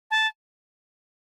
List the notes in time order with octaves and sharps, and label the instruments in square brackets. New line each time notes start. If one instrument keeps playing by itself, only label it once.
[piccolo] A5